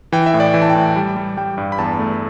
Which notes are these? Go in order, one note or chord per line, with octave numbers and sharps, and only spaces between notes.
E3 G5
E5
A2
D5
E3 G5
A5
G5
A2
G3
G3
G3 G5
G2
B5
E2 A5
A3